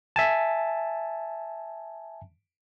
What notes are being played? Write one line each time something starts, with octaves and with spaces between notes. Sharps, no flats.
E5 G#5 A5